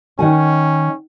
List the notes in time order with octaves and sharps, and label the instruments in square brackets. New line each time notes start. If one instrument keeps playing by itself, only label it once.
[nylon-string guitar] D#3 F#5 G#5 [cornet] C#4